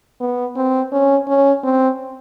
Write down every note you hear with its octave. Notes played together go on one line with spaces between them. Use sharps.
B3
C4
C#4
C#4
C4